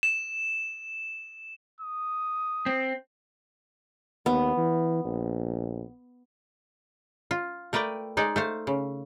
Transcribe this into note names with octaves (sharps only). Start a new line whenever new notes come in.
E7
D#6
C4
D#2 B3
E3
A#1
F4
A3 A#4 B4 D5 G5
G#3 D#4 D5
A3 C5 F5
C#3